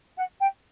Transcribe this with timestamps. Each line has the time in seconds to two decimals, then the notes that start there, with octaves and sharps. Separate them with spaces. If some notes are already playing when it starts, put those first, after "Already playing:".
0.17 F#5
0.40 G5